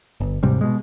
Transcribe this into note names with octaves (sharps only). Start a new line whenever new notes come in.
G1
D#1 G#2 C3 G3
B2 G#3